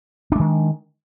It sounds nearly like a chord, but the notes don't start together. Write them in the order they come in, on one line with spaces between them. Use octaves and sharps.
D4 G#3 D#3